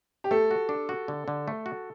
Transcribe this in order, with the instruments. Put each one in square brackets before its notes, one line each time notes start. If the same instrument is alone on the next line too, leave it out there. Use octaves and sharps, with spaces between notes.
[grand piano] G4
[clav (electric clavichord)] A3 [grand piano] A4
[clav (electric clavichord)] F#4
D4
F#4
D3
D3
A3
F#4